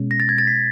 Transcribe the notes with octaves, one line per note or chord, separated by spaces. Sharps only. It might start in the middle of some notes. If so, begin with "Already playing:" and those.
Already playing: B2 G#3 C#4
A#6
A6
G#6
A6
B6